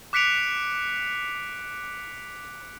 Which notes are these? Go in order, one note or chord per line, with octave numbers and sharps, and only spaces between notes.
D6 F#6 B6 C#7 D7 F7